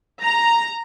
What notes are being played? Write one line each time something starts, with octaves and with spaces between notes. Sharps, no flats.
A#5